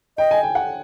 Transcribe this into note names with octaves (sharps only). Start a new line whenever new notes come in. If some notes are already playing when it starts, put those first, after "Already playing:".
D#5 G5
G#5
G5
F#5